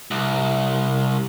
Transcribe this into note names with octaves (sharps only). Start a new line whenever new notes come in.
C2